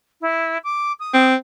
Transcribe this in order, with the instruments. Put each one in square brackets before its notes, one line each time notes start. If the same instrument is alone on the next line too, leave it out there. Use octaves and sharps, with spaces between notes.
[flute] E4
D6
D#6
[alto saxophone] C4